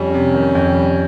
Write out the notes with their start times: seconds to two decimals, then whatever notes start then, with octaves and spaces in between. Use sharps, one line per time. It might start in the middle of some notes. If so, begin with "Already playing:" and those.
Already playing: F2 G3 C#4
0.14 C3
0.34 D#3
0.55 F2
0.75 G3